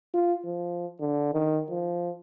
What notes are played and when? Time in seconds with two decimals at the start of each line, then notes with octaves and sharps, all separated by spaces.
0.14 F4
0.45 F3
1.00 D3
1.33 D#3
1.69 F3